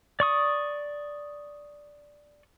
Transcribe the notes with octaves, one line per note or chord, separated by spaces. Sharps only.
D5 C#6 D#6